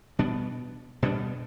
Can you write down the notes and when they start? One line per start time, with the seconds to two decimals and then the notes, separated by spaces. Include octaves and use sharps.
0.19 B2 G3 B3 D4
1.03 B2 G3 B3 D4